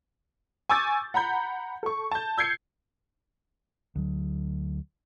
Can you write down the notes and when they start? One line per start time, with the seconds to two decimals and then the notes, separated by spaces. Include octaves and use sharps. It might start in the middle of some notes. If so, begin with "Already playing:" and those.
0.70 G#5 C#6 D6 E6 G6 A6
1.14 F#5 A#5 B5 G6
1.83 A4 C#6
2.11 A5 G6
2.38 E6 G6 G#6 C7 C#7
3.96 D2 F#3